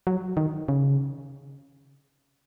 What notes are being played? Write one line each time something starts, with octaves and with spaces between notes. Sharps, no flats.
F#3
D#3
C#3